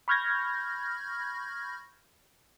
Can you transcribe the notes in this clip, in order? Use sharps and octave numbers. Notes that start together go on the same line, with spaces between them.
B5 C#6 F6 G6 G#6 A#6